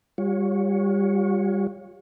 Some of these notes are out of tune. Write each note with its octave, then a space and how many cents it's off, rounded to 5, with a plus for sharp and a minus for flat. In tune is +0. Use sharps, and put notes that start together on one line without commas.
G3 +20 F4 +45 C#5 +0